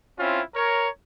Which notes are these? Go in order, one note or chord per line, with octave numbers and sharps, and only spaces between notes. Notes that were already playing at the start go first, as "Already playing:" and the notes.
C4 C#4 E4 F4
A#4 C#5